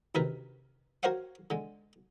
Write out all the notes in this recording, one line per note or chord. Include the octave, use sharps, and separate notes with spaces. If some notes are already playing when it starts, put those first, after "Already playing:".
D2 C3 D#3 A#4 B4
F#4 A#4 C5 C#5 F5 F#5
D3 G#3